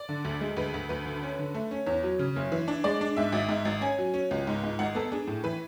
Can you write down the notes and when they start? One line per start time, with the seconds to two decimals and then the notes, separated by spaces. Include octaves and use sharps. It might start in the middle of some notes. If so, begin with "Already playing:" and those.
Already playing: D5
0.09 D3
0.25 D2
0.41 G#3
0.57 D2 B4
0.74 D2
0.89 D2 B4
1.05 D3
1.23 C#4
1.39 D3
1.54 A3
1.71 C#4
1.86 E2 C#5
2.03 F#3
2.19 C#3
2.36 F#1
2.52 E3
2.68 D4
2.84 G#3 D5
3.01 D4
3.17 G#2 E5
3.32 G#1
3.49 G#2
3.65 G#1
3.81 C#4 G#5
3.99 F#3
4.14 C#4
4.31 C#2
4.47 G#2
4.63 G#2
4.79 G#1 F#5
4.95 B3 A4
5.12 D4 G#4
5.27 A2
5.44 E3 B4